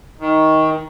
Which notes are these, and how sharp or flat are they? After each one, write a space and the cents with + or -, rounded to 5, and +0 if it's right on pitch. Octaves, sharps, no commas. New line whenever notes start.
D#3 +20